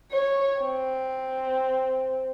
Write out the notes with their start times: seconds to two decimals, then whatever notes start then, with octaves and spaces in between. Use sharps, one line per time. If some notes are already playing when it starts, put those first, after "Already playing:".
0.12 C#5
0.61 C4